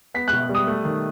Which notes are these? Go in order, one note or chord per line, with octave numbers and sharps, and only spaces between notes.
B3 B6
B2 F#6
G3
D#6
A3
D#3